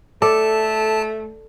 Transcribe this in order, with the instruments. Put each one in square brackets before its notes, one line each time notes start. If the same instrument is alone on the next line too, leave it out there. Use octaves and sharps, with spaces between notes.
[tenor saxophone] A3 [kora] A4 D5 [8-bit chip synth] A5